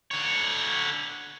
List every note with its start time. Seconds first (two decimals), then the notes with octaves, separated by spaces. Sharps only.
0.11 D3 C#5